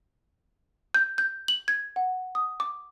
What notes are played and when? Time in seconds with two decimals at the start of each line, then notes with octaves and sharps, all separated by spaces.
0.94 G6
1.18 G6
1.48 F#7
1.68 G#6
1.96 F#5
2.35 D#6
2.60 D6